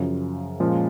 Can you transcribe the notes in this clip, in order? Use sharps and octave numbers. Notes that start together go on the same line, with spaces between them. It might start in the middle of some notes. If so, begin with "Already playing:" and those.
Already playing: F#2 C#3 F3
A#2 F3 G#3 C#4